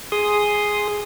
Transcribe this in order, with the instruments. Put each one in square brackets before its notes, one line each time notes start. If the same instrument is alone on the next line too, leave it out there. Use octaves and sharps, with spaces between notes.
[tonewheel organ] G#4 C6 D#6